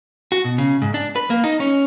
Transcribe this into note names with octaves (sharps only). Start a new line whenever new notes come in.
F#4
B2
C#3
G#2
D4
B4
A#3
D#4
C#4